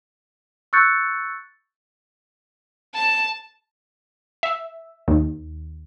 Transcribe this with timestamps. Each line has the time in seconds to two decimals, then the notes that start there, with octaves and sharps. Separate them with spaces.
0.73 C#6 E6 F#6 G6 A6 C#7
2.94 A5
4.43 E5
5.08 D#2